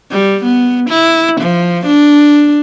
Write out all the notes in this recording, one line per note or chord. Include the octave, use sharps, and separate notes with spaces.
G3
B3
E4
F3
D4